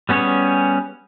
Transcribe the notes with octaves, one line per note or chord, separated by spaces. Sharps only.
G3 B3 C#4 G#4 C#5